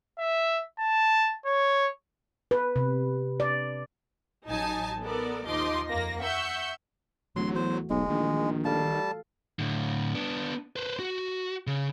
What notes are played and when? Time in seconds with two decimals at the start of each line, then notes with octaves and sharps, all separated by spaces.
0.19 E5
0.79 A5
1.45 C#5
2.51 B4
2.76 C3
3.40 D5
4.47 A1 F#3 D#4 G#5 A5
5.02 B3 A4 A#4 D5
5.46 D#2 F3 D#4 D#5 C6 D6
5.89 F2 A#3 A#6
6.20 E5 F#5 C#6 E6 G6
7.36 D1 E3 F#3 A3 F#4 C6
7.55 E2 C5
7.90 E1 B1 G#3
8.10 A#1 D#3
8.65 G3 A4 F5 A5
9.59 A2 D3
10.14 B3 D4
10.76 B4 C5
10.99 F#4
11.67 C#3